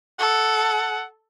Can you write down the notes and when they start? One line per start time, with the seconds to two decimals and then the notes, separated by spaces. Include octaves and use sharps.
0.19 A4 F#5